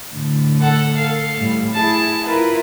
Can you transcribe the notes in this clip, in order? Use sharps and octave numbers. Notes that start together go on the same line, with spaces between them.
A2 D3
A4 F#5
A4 F5
A2 G3
E4 G#4 A5
E4 F4 A#4 B4